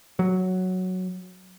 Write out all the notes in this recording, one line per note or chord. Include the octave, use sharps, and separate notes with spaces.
F#3